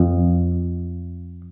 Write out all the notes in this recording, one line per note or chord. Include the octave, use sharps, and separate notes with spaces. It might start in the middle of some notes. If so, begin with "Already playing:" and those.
Already playing: F2